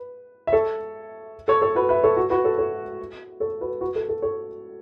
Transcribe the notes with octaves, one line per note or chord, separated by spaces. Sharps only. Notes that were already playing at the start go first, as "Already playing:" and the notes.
Already playing: B4
E5
A4 C#5
A4 C#5
A4 C#5
F#4 B4
B4 E5
A4 C#5
F#4
F#4 B4
A4 C#5
A4 C#5
A4 C#5
F#4 B4
F#4 B4
A4
A4
A4 C#5